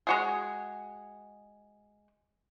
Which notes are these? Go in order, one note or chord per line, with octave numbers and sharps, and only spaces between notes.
G#3 F#4 G#4